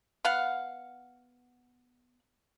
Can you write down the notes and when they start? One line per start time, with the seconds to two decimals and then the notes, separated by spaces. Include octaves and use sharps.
0.25 B3 F5 F#5